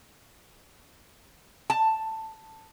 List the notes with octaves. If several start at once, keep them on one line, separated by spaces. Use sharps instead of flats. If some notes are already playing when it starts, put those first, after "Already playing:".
A5